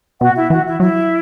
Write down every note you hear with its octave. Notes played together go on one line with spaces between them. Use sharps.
B2 F#4 F#5
E4 E5
E3 F#4 F#5
E4 E5
F#3 E4 E5